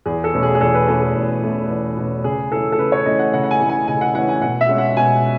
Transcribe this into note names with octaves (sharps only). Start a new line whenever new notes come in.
E2 G#4
A4
B2 A3 C#4
G#4
G#4
E2 A4
B4
B2 A3 C#4 A4
G#4
E2
B2 A3 C#4
E2
B2 A3 C#4
C#3 G#4
E3 A3 C#4 A4
A4
C#3 B4
C#5
E3 A3 C#4 D#5
F#5
C#3 F#5
F#5
G#5
E3 A3 C#4
G#5
C#3 G#5
F#5
E3 A3 C#4 F#5
G#5
B2 F#5
E5
G#3 C#4
F#5
B2 G#5